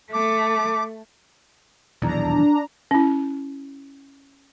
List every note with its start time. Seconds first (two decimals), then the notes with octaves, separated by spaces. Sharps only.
0.13 A3 D6
2.02 D#1 B1 E2 D4 A#5
2.91 C#4 E4